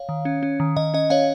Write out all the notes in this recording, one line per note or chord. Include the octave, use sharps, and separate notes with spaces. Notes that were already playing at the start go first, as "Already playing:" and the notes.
Already playing: C#5 F5
D#3
C#4
C#4
D#3
D#3 D#5
C#4 D#5
C#4 C#5 F5